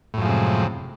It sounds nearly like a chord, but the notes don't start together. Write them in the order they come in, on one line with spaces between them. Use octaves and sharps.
A2 F#2 F3 G#3 C3